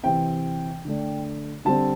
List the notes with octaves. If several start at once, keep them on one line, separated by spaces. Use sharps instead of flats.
C3 E3 C4 G5
D3 A3 D4
D3 G3 C4 A5